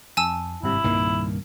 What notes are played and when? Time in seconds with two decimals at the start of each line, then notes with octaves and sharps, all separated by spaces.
0.17 F2 G#5 A5 E6
0.63 G#1 G2 C3 E4
0.84 C2 G2 A#2 D#3 A#3